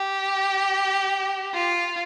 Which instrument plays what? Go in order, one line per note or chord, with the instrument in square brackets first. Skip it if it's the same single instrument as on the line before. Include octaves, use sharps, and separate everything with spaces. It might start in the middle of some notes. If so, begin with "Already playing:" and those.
Already playing: [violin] G4
F4